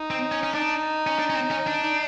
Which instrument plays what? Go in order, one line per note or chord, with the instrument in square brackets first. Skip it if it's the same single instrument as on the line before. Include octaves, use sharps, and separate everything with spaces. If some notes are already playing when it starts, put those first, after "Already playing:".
Already playing: [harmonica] D#4
[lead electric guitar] C4
C#4
C#4
[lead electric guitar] D4 [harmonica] D#4
[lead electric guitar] C#4
D4
C#4
C4
C#4
D4
[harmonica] D#4